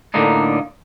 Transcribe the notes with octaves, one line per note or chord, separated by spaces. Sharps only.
A2 D3 A#3 D4 D#4